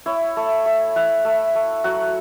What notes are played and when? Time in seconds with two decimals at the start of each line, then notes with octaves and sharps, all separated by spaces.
0.06 E4 C#5
0.37 A3
0.66 A3
0.96 E4 F#5
1.25 A3
1.55 A3
1.84 F#3 F#5